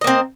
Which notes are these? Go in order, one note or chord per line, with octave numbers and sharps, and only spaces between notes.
A#3 C4 D#5